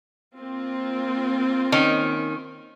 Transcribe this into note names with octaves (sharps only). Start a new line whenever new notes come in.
A#3 C4 F4
D#3 C#4